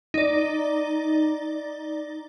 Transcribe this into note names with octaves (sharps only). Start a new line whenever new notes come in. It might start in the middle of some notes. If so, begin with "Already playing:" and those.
D#4 D5